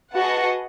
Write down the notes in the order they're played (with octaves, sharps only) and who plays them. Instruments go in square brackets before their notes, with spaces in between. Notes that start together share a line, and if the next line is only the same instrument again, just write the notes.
[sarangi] F#4 [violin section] G#4 B4 D#5 F#5 A5